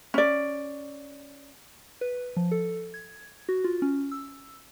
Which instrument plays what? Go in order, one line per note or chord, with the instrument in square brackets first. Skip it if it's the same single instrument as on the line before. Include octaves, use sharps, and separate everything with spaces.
[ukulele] C#4 D5
[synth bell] B4
F3
A4
G#6
F#4
F4
C#4
E6